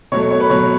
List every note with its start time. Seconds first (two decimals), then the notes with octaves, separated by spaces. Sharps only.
0.12 B2 F#3 A3 C#5
0.31 C#5
0.40 B4
0.50 B2 F#3 A3 C#5